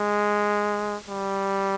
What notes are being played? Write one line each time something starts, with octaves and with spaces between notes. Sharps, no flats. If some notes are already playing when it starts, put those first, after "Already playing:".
Already playing: G#3
G3